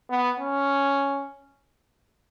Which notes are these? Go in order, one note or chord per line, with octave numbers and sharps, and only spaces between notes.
B3
C#4